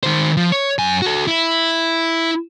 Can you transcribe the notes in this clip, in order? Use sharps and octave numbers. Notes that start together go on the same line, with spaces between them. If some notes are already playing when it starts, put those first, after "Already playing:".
D#3 C5
F3
C#5
F#2 G#5
F#4 A4
E4